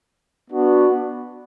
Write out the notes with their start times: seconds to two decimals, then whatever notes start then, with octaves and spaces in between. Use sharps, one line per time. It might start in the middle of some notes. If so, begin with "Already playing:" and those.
0.51 B3 D4 F#4